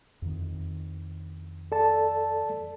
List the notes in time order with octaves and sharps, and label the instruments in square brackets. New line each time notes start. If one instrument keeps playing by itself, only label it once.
[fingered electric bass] F2 D#3
[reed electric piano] A4 D5 A5